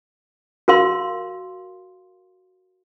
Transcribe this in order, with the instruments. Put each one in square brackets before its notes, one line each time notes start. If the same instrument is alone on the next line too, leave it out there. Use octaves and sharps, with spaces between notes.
[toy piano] F#4 A#4 F5 C6